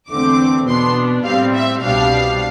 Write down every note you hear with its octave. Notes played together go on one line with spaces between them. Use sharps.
E2 D3 A3 C4 D6
B2 B3 D4 C6
A2 G3 C4 F5
E5
C2 B2 G3 D4 F5